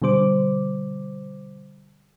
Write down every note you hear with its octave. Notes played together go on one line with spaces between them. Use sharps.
B2 D3 G3 C5 D6